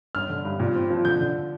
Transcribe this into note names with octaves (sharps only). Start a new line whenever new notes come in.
G1 F6
D3
G2
A#2
C4
F3
D3 G6
D3